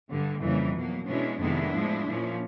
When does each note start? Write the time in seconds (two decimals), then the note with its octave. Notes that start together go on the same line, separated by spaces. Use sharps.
0.09 G2 D3 G3
0.42 F2 C#3 E3 G3 A#3
0.74 B2 F#3 A#3
1.08 B2 G#3 C#4 D4 E4
1.40 F2 C3 D#3 G#3 B3 D4 E4
1.74 A2 F3 G#3
2.07 A#2 F3 A#3 C#4